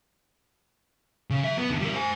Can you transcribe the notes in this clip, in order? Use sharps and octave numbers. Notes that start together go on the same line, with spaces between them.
C#3
F#3 E5
B3
E2 D3
G3 A#4
C5 G#5